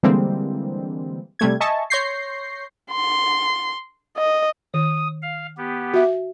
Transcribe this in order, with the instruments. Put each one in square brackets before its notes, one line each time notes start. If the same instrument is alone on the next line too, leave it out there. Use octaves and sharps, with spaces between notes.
[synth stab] D3 E3 G3 G#3 A#3 C4
C3 G3 A3 G#6
D#5 E5 G#5 A5 C#6
C#5 C6 C#6 G6 A#6 C7
[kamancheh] C6
D#5
[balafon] D#3 [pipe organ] D#6
[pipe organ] F5
B3 G4
[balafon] F#4 E5